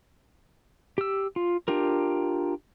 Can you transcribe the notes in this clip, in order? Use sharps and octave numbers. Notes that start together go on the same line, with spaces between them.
G4 E6
F4
D4 F4 G4 A#4